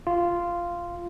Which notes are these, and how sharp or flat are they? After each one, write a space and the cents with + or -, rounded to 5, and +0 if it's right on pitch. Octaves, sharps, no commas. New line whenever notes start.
F4 -10